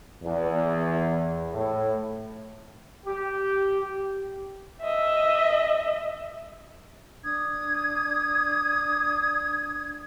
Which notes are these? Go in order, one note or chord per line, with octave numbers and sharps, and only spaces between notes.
E2
A2
G4
D#5 E5
D4 D#6 G#6